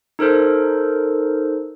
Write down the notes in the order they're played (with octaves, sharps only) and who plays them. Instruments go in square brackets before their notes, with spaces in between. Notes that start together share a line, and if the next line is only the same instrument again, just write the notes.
[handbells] D#4 A4 A#4 C5